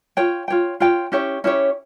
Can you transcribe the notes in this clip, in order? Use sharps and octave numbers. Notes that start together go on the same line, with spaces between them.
F4 C#5 G5
F4 C#5 G5
F4 C#5 G5
C#4 E4 G4 C#5
C#4 E4 G4 C#5